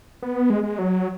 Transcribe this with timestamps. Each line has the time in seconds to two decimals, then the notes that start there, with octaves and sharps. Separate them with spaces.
0.23 B3
0.50 G#3
0.64 G#3
0.79 F#3